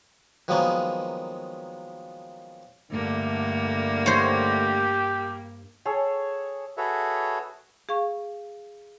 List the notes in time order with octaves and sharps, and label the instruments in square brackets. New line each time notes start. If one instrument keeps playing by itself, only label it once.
[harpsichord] D#3 F3 F#3 G#3 A#3 B3
[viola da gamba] G2 A#3 [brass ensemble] D3 A3
[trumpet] G4 [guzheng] C5 C#5
[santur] G#4 A4 C#5
[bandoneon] F#4 G#4 A4 B4 C#5 E5
[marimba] G#4 F5 C#6